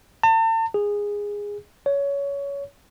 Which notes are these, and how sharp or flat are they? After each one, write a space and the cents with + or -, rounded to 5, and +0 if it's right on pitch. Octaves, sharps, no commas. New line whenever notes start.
A5 +40
G#4 -15
C#5 +20